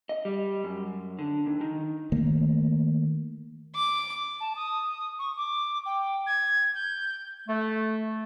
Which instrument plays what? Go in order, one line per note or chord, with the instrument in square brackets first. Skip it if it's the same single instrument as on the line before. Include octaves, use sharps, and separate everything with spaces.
[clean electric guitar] D#5
G3
F#2
D3
D#2
D#3
[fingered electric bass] D#3 A3 A#3
[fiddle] D6
[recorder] A5
D#6
C#6
D6
G5
G#6
G6
[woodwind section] A3